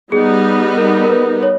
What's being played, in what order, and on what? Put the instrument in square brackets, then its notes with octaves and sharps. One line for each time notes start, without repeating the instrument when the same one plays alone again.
[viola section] G3 B3 D#4 [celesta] G#4
[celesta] A#4
A#4
B4
C#5